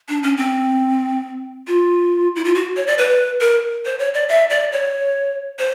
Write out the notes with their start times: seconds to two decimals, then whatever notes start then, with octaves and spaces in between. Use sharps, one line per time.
0.09 D4
0.23 C#4
0.37 C4
1.67 F4
2.36 E4
2.44 F4
2.55 F#4
2.76 C#5
2.87 D5
2.98 B4
3.41 A#4
3.85 C5
3.99 C#5
4.14 D5
4.29 E5
4.50 D5
4.72 C#5
5.59 C5